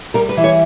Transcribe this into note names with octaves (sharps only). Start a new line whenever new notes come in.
G3 A#4
B4
E3
C#5